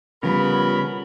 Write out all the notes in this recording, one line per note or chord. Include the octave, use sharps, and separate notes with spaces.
C#3 F3 G3 B3 A#4 B5